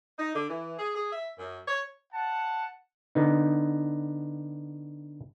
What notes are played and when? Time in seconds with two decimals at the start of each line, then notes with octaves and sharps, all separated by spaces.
0.19 D#4
0.35 D3
0.50 E3
0.79 G#4
0.95 G#4
1.13 E5
1.39 F#2
1.68 C#5
2.12 F#5 A5
3.15 D3 B3 D#4